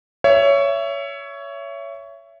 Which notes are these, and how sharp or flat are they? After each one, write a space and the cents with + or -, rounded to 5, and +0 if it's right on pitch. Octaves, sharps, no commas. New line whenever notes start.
C#5 +15 E5 +20